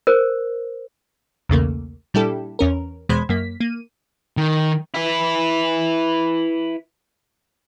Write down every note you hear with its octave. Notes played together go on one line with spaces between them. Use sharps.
A#4 C5
B1 E2 C#3 A3 A#3
A#2 G3 D4 E4 G4 A4
E2 C#4 A#4
E2 B2 G#3 C5 B5 G#6
F#2 A#3 B6
A#3 D#7
D#3
E4 B4